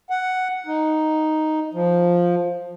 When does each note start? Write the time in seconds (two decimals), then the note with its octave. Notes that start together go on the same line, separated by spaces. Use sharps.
0.10 F#5
0.66 D#4
1.74 F3